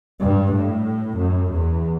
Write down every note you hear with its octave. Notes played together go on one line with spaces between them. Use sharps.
G2
A2
F#2
E2